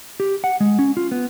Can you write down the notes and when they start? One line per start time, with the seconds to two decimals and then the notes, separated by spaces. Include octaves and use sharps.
0.20 G4
0.44 F#5
0.60 G#3
0.79 C#4
0.97 F4
1.12 B3